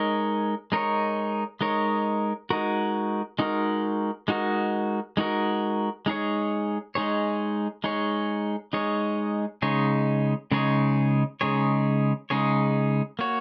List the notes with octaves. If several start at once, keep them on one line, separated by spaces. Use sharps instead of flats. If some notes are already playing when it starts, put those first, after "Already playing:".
Already playing: G#3 D#4 A#4 C#5
G#3 D#4 A#4 C#5
G#3 D#4 A#4 C#5
G#3 D#4 F#4 A#4
G#3 D#4 F#4 A#4
G#3 D#4 F#4 A#4
G#3 D#4 F#4 A#4
G#3 D#4 G#4 C#5
G#3 D#4 G#4 C#5
G#3 D#4 G#4 C#5
G#3 D#4 G#4 C#5
C#3 G#3 D#4 G#4 C#5
C#3 G#3 D#4 G#4 C#5
C#3 G#3 D#4 G#4 C#5
C#3 G#3 D#4 G#4 C#5
A#3 F#4 C#5